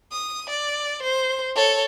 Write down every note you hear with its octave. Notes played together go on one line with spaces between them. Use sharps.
D#6
D5
C5
A4 C#5